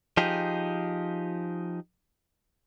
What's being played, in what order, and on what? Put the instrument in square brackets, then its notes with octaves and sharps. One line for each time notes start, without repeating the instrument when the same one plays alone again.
[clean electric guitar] F3 D#4 G4 G#4